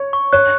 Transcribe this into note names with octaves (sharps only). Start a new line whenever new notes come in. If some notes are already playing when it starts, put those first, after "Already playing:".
Already playing: C#5
C#6
C#5 F#6